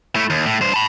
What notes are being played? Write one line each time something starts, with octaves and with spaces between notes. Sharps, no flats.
A3 E4
D#2
A2
G2 C5
A5 B5